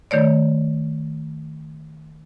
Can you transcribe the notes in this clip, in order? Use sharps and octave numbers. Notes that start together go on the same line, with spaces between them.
D#3 A3 C#5 D5